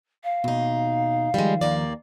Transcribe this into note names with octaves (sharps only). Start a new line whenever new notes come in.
F5
D#2 B2 D#4
D#3 F3 G3 G#3
D#2 A#3 D5